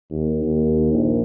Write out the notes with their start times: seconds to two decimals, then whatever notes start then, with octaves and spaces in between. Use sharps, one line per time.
0.10 D#2
0.44 D#2
0.92 A#1